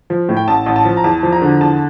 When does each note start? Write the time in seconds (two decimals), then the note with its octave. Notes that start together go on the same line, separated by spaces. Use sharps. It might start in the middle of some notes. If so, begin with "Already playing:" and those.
0.10 F3
0.29 A2
0.37 G5
0.48 A1 A5
0.66 A1
0.76 A5
0.85 F3
0.97 A#5
1.04 E2 A5
1.23 F3
1.32 A#5
1.42 D3
1.61 E2 A5